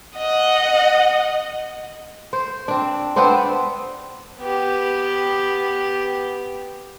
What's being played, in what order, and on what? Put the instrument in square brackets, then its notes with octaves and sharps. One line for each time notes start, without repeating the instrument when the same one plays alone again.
[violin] D#5 F#5
[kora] C5
C4 D4
B3 C4 D4 C5
[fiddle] B3 G4